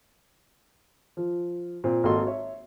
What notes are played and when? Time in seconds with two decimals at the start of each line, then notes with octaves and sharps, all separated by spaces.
1.17 F3
1.84 A#2 C4
2.03 G#1 A#3 F#4 A4 D#5 C6
2.27 C#5 E5